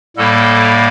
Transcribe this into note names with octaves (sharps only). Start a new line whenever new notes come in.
A2 G3 A#3 A4